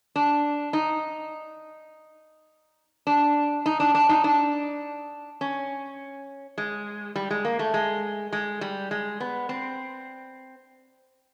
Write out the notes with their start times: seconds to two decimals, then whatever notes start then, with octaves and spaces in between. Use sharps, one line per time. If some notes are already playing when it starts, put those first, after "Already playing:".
0.16 D4
0.73 D#4
3.07 D4
3.66 D#4
3.80 D4
3.95 D4
4.09 D#4
4.24 D4
5.41 C#4
6.58 G#3
7.15 G3
7.30 G#3
7.45 A#3
7.59 A3
7.74 G#3
8.32 G#3
8.61 G3
8.91 G#3
9.20 B3
9.49 C4